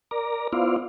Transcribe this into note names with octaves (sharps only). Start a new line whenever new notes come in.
A#4 D5 A#5
B3 E4 F4 C5 D5 F5